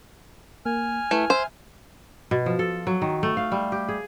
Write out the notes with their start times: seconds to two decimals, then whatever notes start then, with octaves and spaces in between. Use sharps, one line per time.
0.66 A#3 G#5 F6
1.11 A3 E4 B4 E5
1.30 C5 E5
2.31 B2
2.46 F3
2.59 A4
2.87 F#3
3.02 D#3
3.23 A3
3.37 F5
3.52 G3
3.72 G4
3.89 G#4